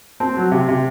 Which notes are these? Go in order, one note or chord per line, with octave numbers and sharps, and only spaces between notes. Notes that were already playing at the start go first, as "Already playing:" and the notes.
C4 A5
F#3
C3
C3